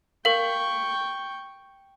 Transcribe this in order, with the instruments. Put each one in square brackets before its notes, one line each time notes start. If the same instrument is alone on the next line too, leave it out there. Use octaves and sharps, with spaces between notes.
[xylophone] A#4 F5 [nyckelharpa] G5 C#6